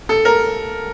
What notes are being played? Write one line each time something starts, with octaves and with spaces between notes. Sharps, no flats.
A4
A#4